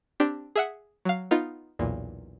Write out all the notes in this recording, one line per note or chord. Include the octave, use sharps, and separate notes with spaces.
C4 D4 G4
G#4 E5 F#5
F#3 F5
B3 D#4 F4
B1 E2 A#2